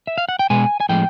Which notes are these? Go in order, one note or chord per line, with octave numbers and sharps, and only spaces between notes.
E5
F5
F#5
G5
B2 G#3 B3 G#5
G#5
A2 F3 G#3 C4 G5